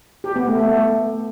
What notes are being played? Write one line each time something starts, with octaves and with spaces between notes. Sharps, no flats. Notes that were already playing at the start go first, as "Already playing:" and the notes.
G4
B3
A3
A3